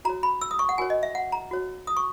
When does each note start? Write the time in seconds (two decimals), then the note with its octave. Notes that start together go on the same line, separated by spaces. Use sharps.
0.05 F#4 C#5 A#5
0.23 B5
0.41 E6
0.51 D#6
0.59 C#6
0.69 F#5
0.78 F#4 A#4 C#5 G#5
0.90 D#5
1.03 E5
1.15 F#5
1.32 A#5
1.51 F#4 C#5
1.87 D#6
1.97 C#6